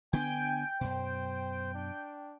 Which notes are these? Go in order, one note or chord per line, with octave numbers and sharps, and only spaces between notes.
D3 B3 D4 G5 G#5
F#2 B2 C5
D4